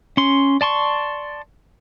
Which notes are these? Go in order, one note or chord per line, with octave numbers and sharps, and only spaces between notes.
C#4 C6
D5 A5 C6 C#6